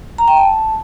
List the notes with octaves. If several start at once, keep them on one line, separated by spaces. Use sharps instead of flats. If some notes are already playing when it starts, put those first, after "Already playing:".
A#5
G5
A5